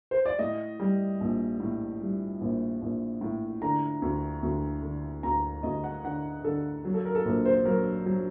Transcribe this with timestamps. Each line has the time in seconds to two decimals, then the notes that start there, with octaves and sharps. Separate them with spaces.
0.11 C5
0.25 D5
0.39 A2 D#5
0.80 G3
1.21 A#1
1.60 A2
2.01 G3
2.41 A#1
2.82 A#1
3.21 A2
3.62 D3 A#5
4.02 D2
4.43 D2
4.83 D3
5.23 D2 A#5
5.63 D2 D#5
5.84 F#5
6.04 D3 F#5
6.44 D3 A4
6.85 F#3
6.94 A4
7.05 A#4
7.15 A4
7.25 A#1 A#4
7.45 C5
7.65 F#3 A#4
8.06 F#3